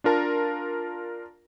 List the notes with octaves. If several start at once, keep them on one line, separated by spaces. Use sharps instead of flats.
D4 F4 A#4 A5